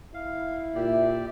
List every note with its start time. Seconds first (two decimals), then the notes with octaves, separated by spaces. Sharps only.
0.14 E4 F5
0.75 A#2 G4 D5 E5